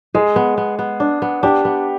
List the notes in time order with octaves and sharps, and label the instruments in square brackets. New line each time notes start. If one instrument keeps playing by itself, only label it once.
[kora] G#3 [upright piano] G#4
[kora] B3
B3
B3
D4
B3
[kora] D4 [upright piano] G4
[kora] B3